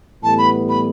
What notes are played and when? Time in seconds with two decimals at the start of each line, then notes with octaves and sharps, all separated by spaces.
0.23 A2 E3 G3 B3 A5
0.38 B5
0.69 B5